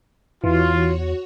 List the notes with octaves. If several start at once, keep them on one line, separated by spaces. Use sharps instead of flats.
E2 E3 F4 F#4 C#5